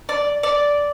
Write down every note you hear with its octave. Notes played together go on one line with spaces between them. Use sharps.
D5
D5